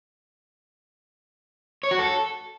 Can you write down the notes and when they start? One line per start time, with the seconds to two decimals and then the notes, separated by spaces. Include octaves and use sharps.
1.83 C#5
1.91 F#4
1.99 A4